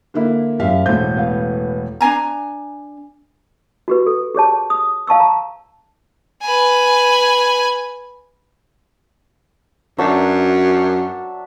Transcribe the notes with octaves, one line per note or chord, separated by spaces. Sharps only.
D3 A#3 E4
F#2 G4 E5 F5
E1 A2 C5 G6
B3 F5
D4 G4 G#5 A#5
F#4 G4 B4
A4
G4 G#4 C#5 A5
D#6
F5 A5 C#6 E6
A5 A#5
B4 G#5
F#2 F#3 D4 E5